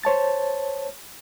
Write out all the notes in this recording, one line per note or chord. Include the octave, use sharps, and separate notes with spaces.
C5 C#5 A5 A6